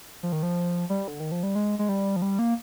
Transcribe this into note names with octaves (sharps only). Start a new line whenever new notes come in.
F3
D#3
F3
G3
D3
D#3
F3
G3
G#3
G#3
G3
F3
G3
A#3